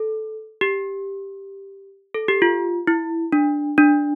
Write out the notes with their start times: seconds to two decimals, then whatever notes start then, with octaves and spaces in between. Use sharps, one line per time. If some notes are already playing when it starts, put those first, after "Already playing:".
Already playing: A4
0.61 G4
2.14 A4
2.28 G4
2.42 F4
2.87 E4
3.32 D4
3.78 D4